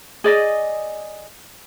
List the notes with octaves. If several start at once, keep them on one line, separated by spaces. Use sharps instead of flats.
G#4 D5 D#5